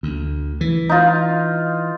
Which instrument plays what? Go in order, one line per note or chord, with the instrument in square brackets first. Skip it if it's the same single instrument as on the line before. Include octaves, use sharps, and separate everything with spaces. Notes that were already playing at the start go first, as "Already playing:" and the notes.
[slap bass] D2
E3
[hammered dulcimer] D#4 F4